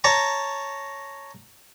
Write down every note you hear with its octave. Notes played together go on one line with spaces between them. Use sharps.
C#5 A5 A#5 C#6